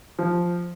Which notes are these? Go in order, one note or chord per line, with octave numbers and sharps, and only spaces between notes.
F3